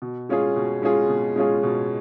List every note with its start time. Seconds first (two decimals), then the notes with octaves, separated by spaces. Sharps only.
0.02 B2
0.29 G#3 C#4 F4 G#4
0.56 B2
0.82 G#3 C#4 F4 G#4
1.09 B2
1.36 G#3 C#4 F4 G#4
1.63 B2